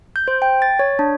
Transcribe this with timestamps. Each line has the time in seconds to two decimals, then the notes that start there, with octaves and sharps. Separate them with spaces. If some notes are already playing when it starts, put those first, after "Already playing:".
0.16 G6
0.28 C5
0.42 G5
0.62 A6
0.79 C#5
0.99 D4